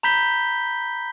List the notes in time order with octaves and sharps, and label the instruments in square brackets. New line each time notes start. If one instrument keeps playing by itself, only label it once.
[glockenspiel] A#5 B5 G6 B6 G7